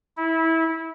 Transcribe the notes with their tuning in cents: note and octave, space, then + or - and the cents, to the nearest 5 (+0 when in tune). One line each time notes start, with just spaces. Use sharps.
E4 -20